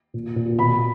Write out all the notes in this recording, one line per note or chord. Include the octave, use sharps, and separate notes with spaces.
A#2
A#2
B2 B5